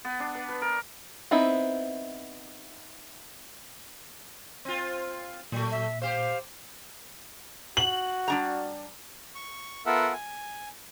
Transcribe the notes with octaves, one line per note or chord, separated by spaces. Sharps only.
B3
D4
B4
B4
A#4
B3 C4 D#4 E4
C4 F4
A#2 F#3 A3
E5
G4 C5 F5
F#4 F#7
G3 D4 A#5
C#6
B3 F4 A4 A#4 E5 F#5
G#5